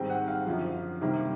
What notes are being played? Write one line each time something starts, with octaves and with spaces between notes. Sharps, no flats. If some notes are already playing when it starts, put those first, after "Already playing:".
Already playing: G#2 D#3 G3 C4 G5
F#5
F5
F#2 D3 F3
C3 D#3 G3 A#3